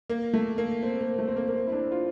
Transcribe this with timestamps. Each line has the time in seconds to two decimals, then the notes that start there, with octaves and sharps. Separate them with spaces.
0.10 A#3
0.34 A3
0.58 A#3
0.83 C4
1.01 A#3
1.19 A3
1.28 C4
1.36 A#3
1.48 A#3
1.55 C4
1.67 E4
1.73 D4
1.91 F4